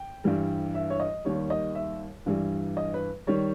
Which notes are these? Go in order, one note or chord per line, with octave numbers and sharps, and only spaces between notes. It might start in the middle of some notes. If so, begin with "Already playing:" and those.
Already playing: G5
G2 E3 G3
E5
C#5
D#5
D#2 D#3 G3 C#5
D#5
E5
G2 E3 G3
D#5
B4
D#3 G3 C#5